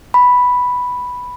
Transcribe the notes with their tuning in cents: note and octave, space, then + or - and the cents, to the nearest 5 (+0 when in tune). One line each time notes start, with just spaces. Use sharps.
B5 +0